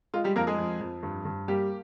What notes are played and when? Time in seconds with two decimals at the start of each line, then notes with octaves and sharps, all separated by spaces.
0.14 G#3 F4
0.24 G3 G4
0.36 F2 A#3 A#4
0.47 G#3 G#4
0.59 F2
0.81 F2
1.03 G2
1.25 G2
1.48 G3 A#3 G4